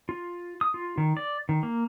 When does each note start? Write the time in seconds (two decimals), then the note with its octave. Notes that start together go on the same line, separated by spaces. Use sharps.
0.09 F4
0.61 D#6
0.74 F4
0.98 D#3
1.17 D5
1.49 D#3
1.63 A#3